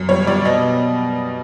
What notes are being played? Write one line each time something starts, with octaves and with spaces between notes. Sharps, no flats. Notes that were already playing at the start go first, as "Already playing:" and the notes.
Already playing: F#2
G3 C#5
G3 D5
B2 D#5